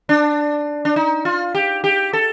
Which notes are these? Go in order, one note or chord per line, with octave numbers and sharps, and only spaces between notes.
D4
D4
D#4
F4
G4
G4
A4